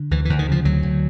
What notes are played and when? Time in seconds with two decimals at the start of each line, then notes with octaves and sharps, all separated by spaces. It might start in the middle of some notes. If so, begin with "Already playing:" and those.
Already playing: D3
0.11 D2 E3
0.25 D2 E3
0.39 D#3
0.48 C#3 F3
0.65 D2 F#3
0.83 D2